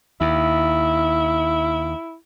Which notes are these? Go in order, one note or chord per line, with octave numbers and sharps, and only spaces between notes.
D#2 E4